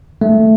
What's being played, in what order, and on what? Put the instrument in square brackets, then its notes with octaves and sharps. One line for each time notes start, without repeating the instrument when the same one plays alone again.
[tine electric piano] A3